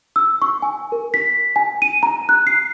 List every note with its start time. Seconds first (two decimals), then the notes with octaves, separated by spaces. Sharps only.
0.16 E6
0.42 C#6
0.62 G#5
0.92 A#4
1.14 B6
1.56 G#5
1.82 D#7
2.03 A#5
2.29 F#6
2.47 C7